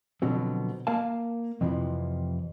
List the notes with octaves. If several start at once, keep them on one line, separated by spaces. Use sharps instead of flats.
B2 D3 F3 F#3 B3 C4
A#3 A#4 F5 A5
F2 C3 E3 F3